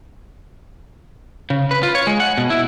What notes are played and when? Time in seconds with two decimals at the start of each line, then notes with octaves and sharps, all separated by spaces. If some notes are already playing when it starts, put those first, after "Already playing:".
1.50 C#3
1.71 B4
1.83 F4
1.95 C#5
2.07 G#3
2.20 F#5
2.38 B2
2.50 E4